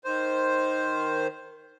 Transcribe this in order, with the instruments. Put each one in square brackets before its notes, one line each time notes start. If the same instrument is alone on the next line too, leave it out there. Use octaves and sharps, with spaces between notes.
[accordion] D#3 C5